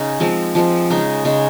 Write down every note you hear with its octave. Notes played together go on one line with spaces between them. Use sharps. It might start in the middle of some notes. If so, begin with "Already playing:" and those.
Already playing: C#3 C#4 D#4
F3 G#3 C4
F3 G#3 C4
C#3 G#3 D#4
C#3 G#3 D#4